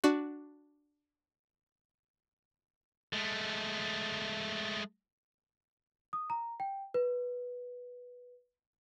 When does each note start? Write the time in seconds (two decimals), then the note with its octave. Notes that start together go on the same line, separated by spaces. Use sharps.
0.04 D4 F#4
3.13 G#3 A3
6.13 D#6
6.30 A#5
6.60 G5
6.94 B4